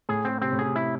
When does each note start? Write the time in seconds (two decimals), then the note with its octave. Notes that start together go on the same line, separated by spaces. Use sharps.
0.09 A2 G#4
0.25 C4
0.42 C3 C4
0.52 A2
0.59 C3 G#4
0.76 E4